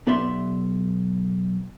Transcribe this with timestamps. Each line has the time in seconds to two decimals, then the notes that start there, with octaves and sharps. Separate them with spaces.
0.07 B1 B3 G4 D5 E5 C6